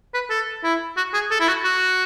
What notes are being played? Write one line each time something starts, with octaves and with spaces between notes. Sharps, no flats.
B4
A4
E4
F#4
G#4
A4
E4
F#4
F#4